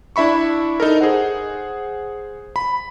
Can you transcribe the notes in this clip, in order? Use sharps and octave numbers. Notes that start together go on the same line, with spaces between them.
D4 E4 E5 B5 C#6
D#4 A4 A#4
G#4 C5 F#5
B5